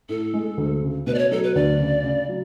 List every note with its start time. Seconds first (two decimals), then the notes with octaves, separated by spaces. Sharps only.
0.09 A2 A4
0.34 G#3
0.57 D2
0.82 C#3
1.07 B2 B4
1.14 D5
1.18 C#5
1.31 F#3 A4
1.44 B4
1.55 D2 D5
1.80 C#3
2.04 C#3
2.28 F#3